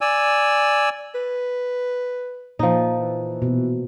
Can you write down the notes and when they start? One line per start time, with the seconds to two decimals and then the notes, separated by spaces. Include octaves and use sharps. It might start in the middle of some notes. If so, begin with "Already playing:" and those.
0.01 D5 G#5 E6
1.15 B4
2.59 A#2 F3 D#4
2.99 E3
3.42 B2